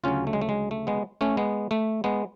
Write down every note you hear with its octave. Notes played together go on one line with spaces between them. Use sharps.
D2 C#3 F#3 C#4 F4
A3
G#3
A3
G#3
A3
G#3 B3
A3 C#4
G#3 B3
A3
G#3 B3